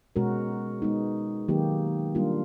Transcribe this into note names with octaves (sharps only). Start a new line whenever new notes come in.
B2 G#3 C#4 F#4 A#4
G#3 B3 D#4
D#3 F#3 A#3 D#4 G4
G3 A#3 D4 F4